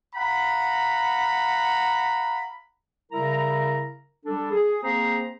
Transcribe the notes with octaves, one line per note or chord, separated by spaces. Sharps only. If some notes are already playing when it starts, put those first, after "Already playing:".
F5 F#5 A#5 B5
C#3 G3 E4 A#4 A#5
G3 D4 A4
G#4
A#3 C4 G#4 C5 A#5